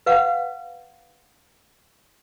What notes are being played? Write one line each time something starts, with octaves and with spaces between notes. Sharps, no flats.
B4 F5 F#5